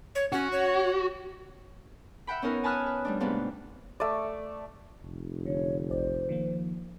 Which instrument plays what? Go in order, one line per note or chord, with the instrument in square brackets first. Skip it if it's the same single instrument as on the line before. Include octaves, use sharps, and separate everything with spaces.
[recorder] C#5
[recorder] C#4 [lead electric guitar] F#4
[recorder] C#5
[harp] E5 F#5 G5 B5
B3 C#4 D#4 A#4 C#5
G#5 A5 B5 D#6 F6 F#6
B4
G3 A3 D4
G#2 C3 A3 B3 D4 F4
[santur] A3 D5
[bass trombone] F1
[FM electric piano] D3 [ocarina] C#5
[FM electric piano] A1 D5 [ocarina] C5
[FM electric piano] D#3 F3 A#3